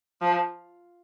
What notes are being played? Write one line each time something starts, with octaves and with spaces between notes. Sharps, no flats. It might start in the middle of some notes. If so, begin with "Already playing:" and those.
F3